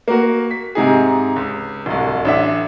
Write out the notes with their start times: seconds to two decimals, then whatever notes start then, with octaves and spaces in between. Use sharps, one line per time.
0.08 A#3 F#4
0.51 B6
0.75 G#2 C3 D#4 G#4
1.36 C#2
1.86 D1 C2
2.25 A1 D4 E5